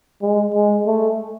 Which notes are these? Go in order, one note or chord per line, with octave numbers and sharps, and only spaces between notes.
G#3
G#3
A3